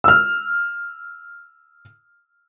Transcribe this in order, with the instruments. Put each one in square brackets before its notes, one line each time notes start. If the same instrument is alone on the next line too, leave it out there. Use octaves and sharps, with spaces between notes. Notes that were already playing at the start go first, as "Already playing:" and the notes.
[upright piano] E6 F6